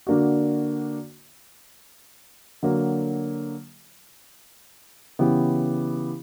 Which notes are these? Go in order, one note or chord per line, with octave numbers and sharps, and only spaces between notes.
D3 A#3 D4 F#4
D3 F#3 A#3
C#3 E3 B3 E4 G4